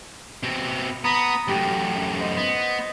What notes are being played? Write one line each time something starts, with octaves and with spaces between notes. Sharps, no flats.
B2 C4
B3 A#5 B5 D#6
F#2 A2 G4
C5 D#5
B3